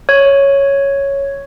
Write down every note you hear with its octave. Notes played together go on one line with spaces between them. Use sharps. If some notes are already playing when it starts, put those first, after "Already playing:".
C#5